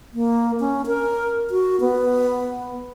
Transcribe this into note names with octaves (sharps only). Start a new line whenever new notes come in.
A#3
C#4
A#4
F#4
B3